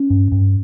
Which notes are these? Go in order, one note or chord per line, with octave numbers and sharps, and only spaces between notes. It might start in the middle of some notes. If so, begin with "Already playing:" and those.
Already playing: C#4
G2
G2